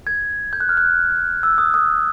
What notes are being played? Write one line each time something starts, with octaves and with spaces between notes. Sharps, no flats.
G#6
G6
F#6
F6
F#6
E6
D#6
D#6